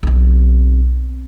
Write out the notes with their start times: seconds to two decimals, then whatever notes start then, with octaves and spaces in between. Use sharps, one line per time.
0.03 B1 C4